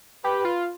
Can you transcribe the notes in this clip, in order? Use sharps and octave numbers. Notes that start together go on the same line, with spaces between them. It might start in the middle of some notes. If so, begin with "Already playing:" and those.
G4 B4
F4